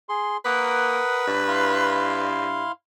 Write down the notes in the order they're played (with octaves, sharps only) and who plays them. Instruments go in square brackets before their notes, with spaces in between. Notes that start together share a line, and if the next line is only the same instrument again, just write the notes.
[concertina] G#4 C6
[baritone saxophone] A#3 [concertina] A#4 F#5 D#6 [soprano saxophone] B4
[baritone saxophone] G2
[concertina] E4 F5 C6